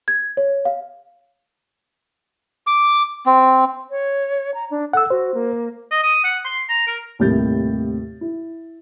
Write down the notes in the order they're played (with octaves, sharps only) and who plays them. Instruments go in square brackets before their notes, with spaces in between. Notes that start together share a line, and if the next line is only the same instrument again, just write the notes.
[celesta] G#6
C#5
F5
[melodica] D6
C4
[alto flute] C#5
A#5
D4
[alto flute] A4 [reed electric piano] F#5 E6
[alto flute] F#4 [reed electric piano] C5
[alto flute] A#3
[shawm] D#5
D#6
F#5
C6
A#5
A#4
[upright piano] D#2 A2 C3 G3 G6 A6
E4